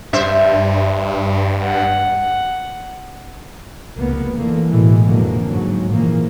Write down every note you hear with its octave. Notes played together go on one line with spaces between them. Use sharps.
G2 C5 E5
F#5
F1 C#2 A#3 B3
D3 E3 A3 A#3
A1 B2 E3 G#3
F2 B2 D3 F3 A#3
G#2 F#3
A#2 C#3 E3 F3 A#3